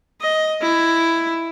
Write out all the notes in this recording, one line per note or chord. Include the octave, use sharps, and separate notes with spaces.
D#5
E4